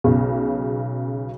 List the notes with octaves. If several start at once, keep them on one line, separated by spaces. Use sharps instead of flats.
B1 C#3